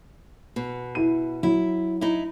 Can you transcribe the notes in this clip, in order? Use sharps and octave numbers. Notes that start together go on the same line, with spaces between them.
B2
E4 D#7
F#3 E4
D#4 E4